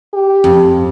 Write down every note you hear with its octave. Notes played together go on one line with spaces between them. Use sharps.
G4
F2